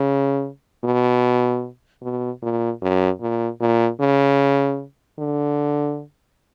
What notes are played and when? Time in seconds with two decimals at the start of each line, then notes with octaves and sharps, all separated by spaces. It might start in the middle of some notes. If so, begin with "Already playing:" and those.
Already playing: C#3
0.84 B2
2.03 B2
2.42 A#2
2.82 F#2
3.21 A#2
3.61 A#2
4.00 C#3
5.19 D3